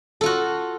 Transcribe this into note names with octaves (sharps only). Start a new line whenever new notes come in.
F4 F#4 A4